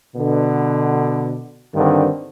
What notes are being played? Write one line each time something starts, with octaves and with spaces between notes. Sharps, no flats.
B2 D3
G2 D3 D#3 C4